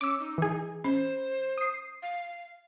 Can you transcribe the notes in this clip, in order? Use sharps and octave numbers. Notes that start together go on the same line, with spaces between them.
C#4 D6 E6
D#4
E3 G#4
C#4 C5
D#6 C7
F5